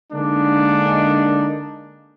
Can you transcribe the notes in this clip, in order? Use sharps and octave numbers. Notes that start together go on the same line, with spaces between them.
D3 G#3 A#3 D4 D#4